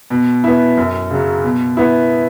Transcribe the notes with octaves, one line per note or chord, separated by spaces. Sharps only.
B2
B3 E4
F#2
C#3 F#3
B2
B3 E4